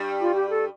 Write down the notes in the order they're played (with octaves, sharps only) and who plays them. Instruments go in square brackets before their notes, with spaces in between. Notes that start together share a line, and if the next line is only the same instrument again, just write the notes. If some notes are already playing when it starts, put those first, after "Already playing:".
Already playing: [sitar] G2 G3
[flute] F4
G4
A4